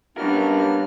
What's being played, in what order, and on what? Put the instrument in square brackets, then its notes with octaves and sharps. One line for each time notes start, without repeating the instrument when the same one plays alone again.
[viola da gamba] G3 [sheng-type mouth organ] A#3 B3 F6 [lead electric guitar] C#4 A#4 [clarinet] D4